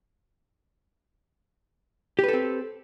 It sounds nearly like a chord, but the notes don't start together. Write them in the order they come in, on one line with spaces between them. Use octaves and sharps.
G4 B4 A4 C4